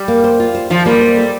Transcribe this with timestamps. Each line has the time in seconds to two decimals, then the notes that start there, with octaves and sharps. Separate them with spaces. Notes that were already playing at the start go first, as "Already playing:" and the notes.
Already playing: G3
0.08 A#3
0.24 C5
0.40 F4
0.55 C5
0.70 F3 F4
0.86 G3 A#3
1.01 C5
1.17 A4